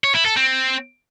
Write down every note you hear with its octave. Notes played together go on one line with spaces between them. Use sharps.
C#5
E4
A4
C4